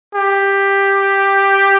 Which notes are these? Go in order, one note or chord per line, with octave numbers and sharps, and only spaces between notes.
G4